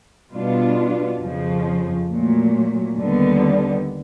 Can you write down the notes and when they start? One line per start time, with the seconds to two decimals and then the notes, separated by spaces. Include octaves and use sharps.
0.32 B2 G3 B3 D4 F4
1.20 F2 C#3 F3
2.08 A#2 F#3 A3
2.97 D#2 D3 G3 B3